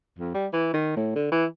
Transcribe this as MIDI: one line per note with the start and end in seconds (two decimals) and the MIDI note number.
0.19 0.33 41
0.34 0.47 55
0.53 0.70 52
0.74 0.94 51
0.96 1.11 45
1.15 1.29 50
1.32 1.45 52